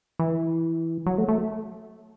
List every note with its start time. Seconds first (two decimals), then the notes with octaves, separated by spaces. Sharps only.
0.19 E3
1.06 F#3
1.18 A3
1.28 A3